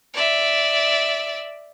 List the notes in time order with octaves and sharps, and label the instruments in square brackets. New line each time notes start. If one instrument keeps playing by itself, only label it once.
[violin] D5 E5